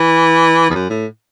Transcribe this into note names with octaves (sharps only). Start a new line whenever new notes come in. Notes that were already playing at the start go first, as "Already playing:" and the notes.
Already playing: E3
E2
F#2
A2